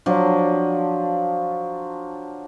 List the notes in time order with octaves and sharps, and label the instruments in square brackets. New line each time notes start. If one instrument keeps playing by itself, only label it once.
[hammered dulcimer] F3 F#3 D4